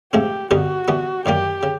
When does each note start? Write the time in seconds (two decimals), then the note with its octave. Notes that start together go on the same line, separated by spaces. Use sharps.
0.13 G#2 F3 A3 C4 G4
0.51 G2 D3 G3 B3 D#4 F#4
0.88 E3 G3 B3
1.25 F#2 D#3 G3 A#3 G4
1.63 C#3